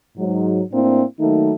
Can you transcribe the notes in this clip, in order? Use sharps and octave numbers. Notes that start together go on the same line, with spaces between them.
G#2 F#3
A2 A#3 C4 D4 E4
D#3 F#3 A3 A#3 D#4